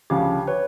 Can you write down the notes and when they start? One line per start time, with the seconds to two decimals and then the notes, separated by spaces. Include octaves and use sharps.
0.10 D2 C#3 F3 G4
0.47 B4 C#5